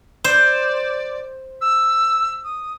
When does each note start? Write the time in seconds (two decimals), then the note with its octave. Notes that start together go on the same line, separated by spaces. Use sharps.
0.24 C5 D5
1.61 E6
2.44 D#6